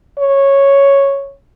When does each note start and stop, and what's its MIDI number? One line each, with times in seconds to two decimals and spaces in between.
0.19 1.34 73